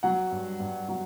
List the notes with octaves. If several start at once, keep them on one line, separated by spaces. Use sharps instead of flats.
F#3 F#5
G2
G2
F#3